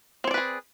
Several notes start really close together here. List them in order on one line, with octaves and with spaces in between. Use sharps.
C4 C#5 D5 B4 G#4